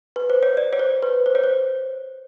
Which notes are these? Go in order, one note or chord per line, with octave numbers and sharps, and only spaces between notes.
B4
C5
C#5
D5
C#5
C5
B4
C5
C#5
C5